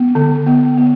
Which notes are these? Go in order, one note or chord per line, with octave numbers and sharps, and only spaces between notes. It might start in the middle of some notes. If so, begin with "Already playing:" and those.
Already playing: B3
D3
B3
B3